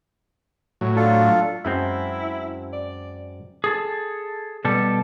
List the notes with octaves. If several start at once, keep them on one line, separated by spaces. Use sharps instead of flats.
A2 F#3
D4 F4 A4
F#2 G#3 C4 E4
D5
G#4 A4
B2 G3 A4